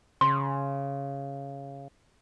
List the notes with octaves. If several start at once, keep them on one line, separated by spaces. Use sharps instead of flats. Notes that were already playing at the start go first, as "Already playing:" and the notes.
C#3 C6